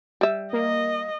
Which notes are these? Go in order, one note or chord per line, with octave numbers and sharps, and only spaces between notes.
G3 E5
A#3 D#5